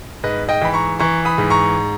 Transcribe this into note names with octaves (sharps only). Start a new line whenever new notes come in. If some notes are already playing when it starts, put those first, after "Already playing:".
G#2 B4 D#5
D#5 G5
E3 B5
A#5 C#6
E3 A#5 C#6
B5 D#6
G#2
A#5 C#6